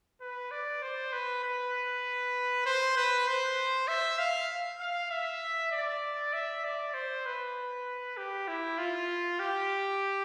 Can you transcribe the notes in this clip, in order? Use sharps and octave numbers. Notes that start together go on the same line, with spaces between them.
B4
D5
C5
B4
B4
C5
B4
C5
E5
F5
F5
E5
D5
E5
D5
C5
B4
G4
E4
F4
G4